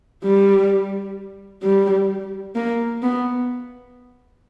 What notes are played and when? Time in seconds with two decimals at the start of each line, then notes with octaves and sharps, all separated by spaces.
0.24 G3
1.63 G3
2.55 A#3
3.02 B3